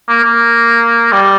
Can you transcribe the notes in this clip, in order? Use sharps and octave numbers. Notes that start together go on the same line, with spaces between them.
A#3
A#3
G3